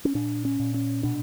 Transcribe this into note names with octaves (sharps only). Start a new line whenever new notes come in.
C#4
A#2 D4
C#4
A#2
C#4
B2 D4